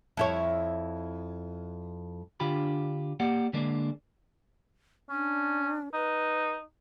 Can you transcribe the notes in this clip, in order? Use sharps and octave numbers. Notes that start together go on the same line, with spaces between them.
F2 E4 C#5
D3 D4 F4 G4 B5
A#3 G4 D5 F#5
D3 G#3 A#3 D4
C#4 D4
D#4 B4